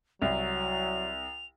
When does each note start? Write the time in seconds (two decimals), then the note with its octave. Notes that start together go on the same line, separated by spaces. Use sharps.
0.22 C2 F#3 F7